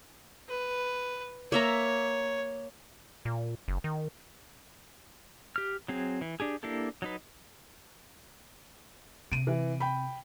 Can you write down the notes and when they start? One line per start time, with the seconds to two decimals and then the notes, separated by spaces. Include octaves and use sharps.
0.49 B4
1.52 A#3 C#5 E5 A#5
3.25 A#2
3.68 F#1
3.84 D#3
5.56 G4 F6
5.88 F#3 C4 G#4
6.21 E3
6.40 D4 G4 G#4
6.63 A#3 D4 E4 G4 A4
7.02 F#3 D#4 B4
9.32 C3 D7 D#7
9.47 E3
9.80 G5 B5